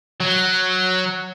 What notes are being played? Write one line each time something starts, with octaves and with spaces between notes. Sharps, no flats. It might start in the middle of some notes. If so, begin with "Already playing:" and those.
F#3